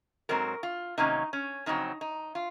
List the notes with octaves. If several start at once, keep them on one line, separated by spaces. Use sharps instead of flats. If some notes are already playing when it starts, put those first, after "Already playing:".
G#2 F#3 C4 A#4
F4
C3 D#3 F#3 A#3 C#4 D#4
C#4
F2 C#3 F#3 C4 D#4
D#4
F4